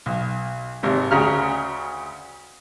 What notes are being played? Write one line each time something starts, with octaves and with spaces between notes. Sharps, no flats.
B1
G#1 C3
D2 C#3 A#5 F6